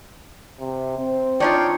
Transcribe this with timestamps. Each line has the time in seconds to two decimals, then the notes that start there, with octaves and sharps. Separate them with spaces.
0.60 C3
0.99 C4
1.40 D4 D#4 F4 C#5 G5